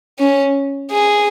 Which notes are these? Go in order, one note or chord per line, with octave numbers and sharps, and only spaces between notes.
C#4
G#4